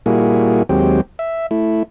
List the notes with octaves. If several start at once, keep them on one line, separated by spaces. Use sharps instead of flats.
A#2 G3 A#3 E4 F#4 G#4
D#2 F#3 G#3 C4 G4
E5
A3 E4